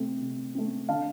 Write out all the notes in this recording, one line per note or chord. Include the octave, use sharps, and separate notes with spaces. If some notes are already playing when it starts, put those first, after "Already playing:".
Already playing: C3 A3 C4
C3
A3 C4
D3 F5 A5